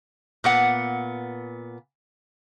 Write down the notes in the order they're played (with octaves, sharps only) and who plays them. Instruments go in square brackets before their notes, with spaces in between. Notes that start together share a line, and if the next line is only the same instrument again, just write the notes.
[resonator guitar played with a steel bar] A#2 B3 F#5